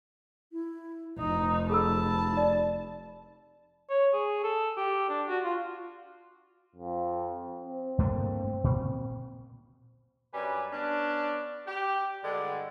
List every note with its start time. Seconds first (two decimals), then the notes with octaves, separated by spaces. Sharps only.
0.52 E4
1.19 F1 D#4 D#6
1.70 G#4 A4 A5 B5 E6
2.33 D#4 D5
3.90 C#5
4.13 G#4
4.44 A4
4.77 G4
5.09 D4
5.28 F#4
5.44 F4
6.75 F2
7.63 C4
7.98 G2 A3 A#3
8.64 A#2
10.34 F#2 G3 D4 B4 G#5
10.73 B3 C#4 D4
11.67 G4
12.23 G2 D3 G#3 F#4 D5